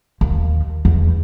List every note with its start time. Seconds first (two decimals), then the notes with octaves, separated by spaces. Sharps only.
0.21 D#2
0.85 E2